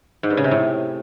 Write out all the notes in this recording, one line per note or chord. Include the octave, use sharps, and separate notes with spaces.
G#2
G2
C#3
C3
A2